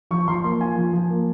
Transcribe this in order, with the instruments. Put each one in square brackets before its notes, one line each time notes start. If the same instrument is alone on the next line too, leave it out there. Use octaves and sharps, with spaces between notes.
[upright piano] F3 [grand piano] C#6
[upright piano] F3 [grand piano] C6
[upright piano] A#3 [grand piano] C6
[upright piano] F4 [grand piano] G#5
[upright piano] F3
F3
A#3